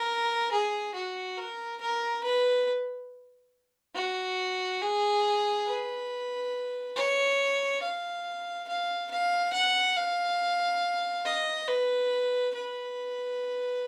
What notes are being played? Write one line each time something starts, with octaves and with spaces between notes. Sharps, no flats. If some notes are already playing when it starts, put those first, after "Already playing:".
Already playing: A#4
G#4
F#4
A#4
A#4
B4
F#4
G#4
B4
C#5
F5
F5
F5
F#5
F5
D#5
B4
B4